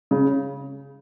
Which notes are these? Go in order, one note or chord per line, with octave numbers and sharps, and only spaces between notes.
C#3